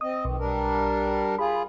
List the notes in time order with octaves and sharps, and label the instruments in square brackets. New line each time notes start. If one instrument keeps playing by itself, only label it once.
[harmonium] C4 D#5 [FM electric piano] D#6
[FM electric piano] B1 [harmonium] F2 D#3
[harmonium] G3 D4 A#4
[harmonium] F4 G#4 [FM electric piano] B5